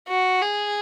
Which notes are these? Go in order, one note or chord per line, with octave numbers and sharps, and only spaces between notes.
F#4
G#4